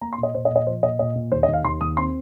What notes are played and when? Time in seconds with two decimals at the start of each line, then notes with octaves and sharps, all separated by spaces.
0.01 A#3 A#5
0.13 C6
0.18 A#2
0.23 D#5
0.34 A#2 C5
0.45 D#5
0.51 A#2
0.56 D#5
0.67 F3 C5
0.83 A#2 D#5
0.99 A#2 D#5
1.15 A#2
1.32 D#2 C5
1.43 D#5
1.48 D#2
1.53 F5
1.64 D#2 C6
1.81 D#2 D#6
1.97 C4 C6